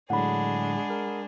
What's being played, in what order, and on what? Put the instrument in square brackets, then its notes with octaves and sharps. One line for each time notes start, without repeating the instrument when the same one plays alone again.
[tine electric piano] A2 D3 F#3 [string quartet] G#3 D4 G#4 [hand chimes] F#5 B5
[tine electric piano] A#4